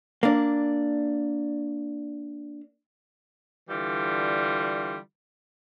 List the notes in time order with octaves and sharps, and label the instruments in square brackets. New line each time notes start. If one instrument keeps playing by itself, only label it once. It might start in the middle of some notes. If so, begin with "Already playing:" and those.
[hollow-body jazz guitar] A#3 D4
[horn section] D3 E3 G3 F4